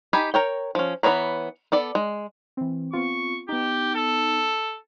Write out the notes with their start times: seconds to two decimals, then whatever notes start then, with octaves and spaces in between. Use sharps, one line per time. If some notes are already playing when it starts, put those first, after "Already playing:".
0.13 D#4 G4 G#5 B5
0.34 A#4 C#5 G5
0.75 F3 C#4
1.03 E3 B3 B4 C#5 A#5
1.72 B3 A4 D5
1.95 G#3
2.57 E3 C4
2.93 B3 C4 F4 C#6
3.49 B3 D#4 G4
3.95 A4